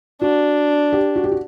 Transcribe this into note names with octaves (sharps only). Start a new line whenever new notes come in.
D4 F#4
G4
F#4
G4
F#4